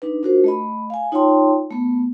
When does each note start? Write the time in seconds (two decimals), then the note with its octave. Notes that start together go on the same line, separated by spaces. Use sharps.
0.02 D4 D#4 B4
0.23 D4 F4 F#4 A#4 C5
0.44 A3 D#5 B5
0.90 F5 G#5
1.12 D#4 F4 C#5 G5 A5 C6
1.70 A3 B3